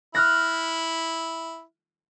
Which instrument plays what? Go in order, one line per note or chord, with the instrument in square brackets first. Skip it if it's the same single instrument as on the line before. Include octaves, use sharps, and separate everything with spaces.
[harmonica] E4 [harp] F6 F#6 A#6